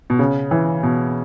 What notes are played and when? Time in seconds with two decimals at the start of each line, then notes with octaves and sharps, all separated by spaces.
0.10 B2
0.19 C#3
0.51 E3
0.83 B2